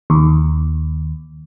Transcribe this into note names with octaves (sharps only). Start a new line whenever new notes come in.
D#2